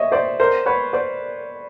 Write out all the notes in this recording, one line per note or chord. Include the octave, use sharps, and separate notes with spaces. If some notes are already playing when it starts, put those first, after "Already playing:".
Already playing: C#5 D#5 E5
C5 D5
A#4 C5
B4 C#5
C5 D5